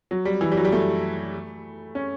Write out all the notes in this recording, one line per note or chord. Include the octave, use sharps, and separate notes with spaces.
F#3
G3
E3
G3
F#3
G3
A3
C#4